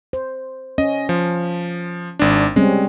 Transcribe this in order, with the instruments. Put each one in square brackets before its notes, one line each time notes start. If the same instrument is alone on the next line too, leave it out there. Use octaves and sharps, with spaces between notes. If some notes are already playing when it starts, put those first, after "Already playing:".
[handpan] C5
[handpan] C#4 [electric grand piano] D#5
[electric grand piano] F3
G#1 D4
[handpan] G3 C4 C#4 [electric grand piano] G#3